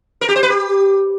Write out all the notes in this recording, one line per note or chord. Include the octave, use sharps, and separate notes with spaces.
A#4
G4
C5
B4
G4